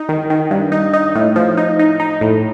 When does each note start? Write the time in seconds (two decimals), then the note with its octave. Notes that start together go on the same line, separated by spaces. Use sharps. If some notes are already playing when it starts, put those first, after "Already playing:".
Already playing: D#4
0.09 D#3
0.30 D#3
0.51 G2
0.72 D#4
0.93 D#4
1.15 A2
1.36 F3
1.57 D#4
1.79 D#4
2.00 D#4
2.21 A2